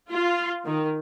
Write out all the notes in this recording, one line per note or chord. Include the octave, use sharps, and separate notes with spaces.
F4
D#3